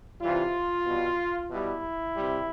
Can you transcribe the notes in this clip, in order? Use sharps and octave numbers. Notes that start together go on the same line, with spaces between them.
C3 E3 G3 F4
B2 G3
B2 G3 E4
C3 G3